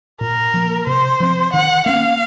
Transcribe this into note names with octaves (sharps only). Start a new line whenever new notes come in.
A#2 A#4
F3 A#3
C3 C5
F3 C4
D#3 F#5
A#3 C#4 F5